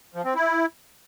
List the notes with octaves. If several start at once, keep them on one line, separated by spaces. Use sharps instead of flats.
F3
C4
E4